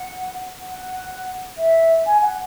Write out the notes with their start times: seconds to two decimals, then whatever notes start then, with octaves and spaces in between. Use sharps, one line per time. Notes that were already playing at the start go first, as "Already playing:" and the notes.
Already playing: F#5
0.61 F#5
1.58 E5
2.06 G#5
2.22 F#5